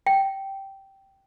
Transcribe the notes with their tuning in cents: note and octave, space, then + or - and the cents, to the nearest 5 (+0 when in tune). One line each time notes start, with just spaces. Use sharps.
G5 -10